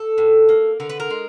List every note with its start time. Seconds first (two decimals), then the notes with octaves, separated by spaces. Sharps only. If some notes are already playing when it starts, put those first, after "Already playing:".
Already playing: A4
0.18 A2
0.49 A#3
0.80 D3 A#4
0.90 B4
1.00 A#4
1.10 G#3